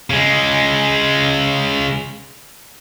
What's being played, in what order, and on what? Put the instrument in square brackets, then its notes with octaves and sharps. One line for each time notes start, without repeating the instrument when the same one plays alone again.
[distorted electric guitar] C#3 G#3